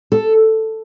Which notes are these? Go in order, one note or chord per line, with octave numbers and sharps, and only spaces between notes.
A4